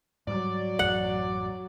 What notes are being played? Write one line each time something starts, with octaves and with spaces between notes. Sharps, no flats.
G#2 F#3 G3 D5
A1 F#2 F#5